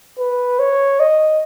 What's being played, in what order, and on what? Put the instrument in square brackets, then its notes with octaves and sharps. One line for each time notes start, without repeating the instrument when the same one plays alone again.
[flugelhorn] B4
C#5
D#5